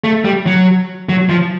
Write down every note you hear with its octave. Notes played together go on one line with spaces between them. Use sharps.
A3
G3
F#3
F#3
F3